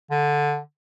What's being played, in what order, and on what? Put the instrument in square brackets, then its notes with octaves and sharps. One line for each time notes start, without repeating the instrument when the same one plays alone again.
[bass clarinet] D3